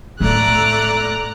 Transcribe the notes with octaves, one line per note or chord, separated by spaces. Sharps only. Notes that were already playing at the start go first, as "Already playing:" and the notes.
A2 A3 D5 A#5 F#6